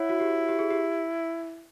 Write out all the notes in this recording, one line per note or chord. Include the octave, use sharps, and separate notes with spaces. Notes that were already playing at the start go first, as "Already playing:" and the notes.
Already playing: E4 C#5 F#5
F#4
G4
G4
G#4
G4